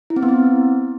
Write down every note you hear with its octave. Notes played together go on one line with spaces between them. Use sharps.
E4
C4
B3
C4